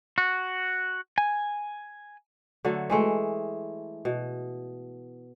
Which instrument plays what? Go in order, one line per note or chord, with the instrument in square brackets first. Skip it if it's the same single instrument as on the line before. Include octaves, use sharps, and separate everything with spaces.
[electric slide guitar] F#4
G#5
[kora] D3 F#3 A3
E3 G#3 A3
B2